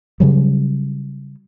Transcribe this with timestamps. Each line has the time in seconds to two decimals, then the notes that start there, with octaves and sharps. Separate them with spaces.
0.20 C#3 F#3 G3